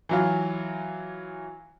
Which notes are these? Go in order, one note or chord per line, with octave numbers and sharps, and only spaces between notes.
E3 F#3 F4